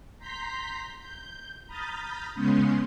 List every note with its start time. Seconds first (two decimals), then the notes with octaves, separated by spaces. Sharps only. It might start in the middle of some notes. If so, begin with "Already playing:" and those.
0.19 A#5 C6 G6 B6
0.99 G6
1.67 A#5 B5 D#6 F6 G6 A6
2.34 C#3 G#3 B3 C#4 C6 G6